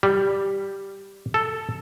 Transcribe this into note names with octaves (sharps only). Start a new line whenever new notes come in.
G3
A4